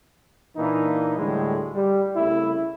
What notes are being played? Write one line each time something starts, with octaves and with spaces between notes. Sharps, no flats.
A#2 E3 A#3 D4 D#4
D2 A2 D3 G3 G#3
G3
C2 C#3 A3 E4